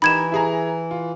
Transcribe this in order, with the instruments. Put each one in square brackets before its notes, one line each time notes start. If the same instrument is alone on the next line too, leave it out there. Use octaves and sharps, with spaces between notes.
[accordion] E3 [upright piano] D#4 G4 A#4 [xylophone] B5 G#6 E7
[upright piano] E4 G#4 A#5
F4